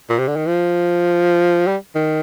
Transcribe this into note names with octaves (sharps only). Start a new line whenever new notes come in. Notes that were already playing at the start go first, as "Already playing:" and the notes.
A#2
C3
D3
D#3
F3
G3
D#3